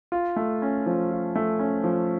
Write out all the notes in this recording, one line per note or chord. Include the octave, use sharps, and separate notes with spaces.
F4
A3
C#4
F3
F4
A3
C#4
F3